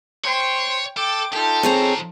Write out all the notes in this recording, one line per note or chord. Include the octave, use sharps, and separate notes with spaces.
C5 C#5 G5
A4 G5 D6
D#4 F4 G4 A4
F3 C4 G#4 C#5 A#5